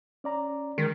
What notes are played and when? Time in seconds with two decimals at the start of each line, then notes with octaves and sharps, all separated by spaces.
0.24 C#4 D5 A#5
0.78 D#3 G#3